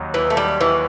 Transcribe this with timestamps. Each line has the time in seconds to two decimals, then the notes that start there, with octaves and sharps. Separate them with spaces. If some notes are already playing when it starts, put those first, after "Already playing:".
Already playing: D#2 D#3 F#3
0.14 E3
0.30 A3
0.37 G3
0.61 E3